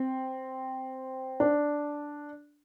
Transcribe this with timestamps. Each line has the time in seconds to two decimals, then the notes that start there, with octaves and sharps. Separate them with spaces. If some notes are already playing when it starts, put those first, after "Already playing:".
Already playing: C4
1.40 D4